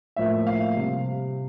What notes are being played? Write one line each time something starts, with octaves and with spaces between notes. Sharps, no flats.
A2 F3 A#3 E5
F5
C3 G3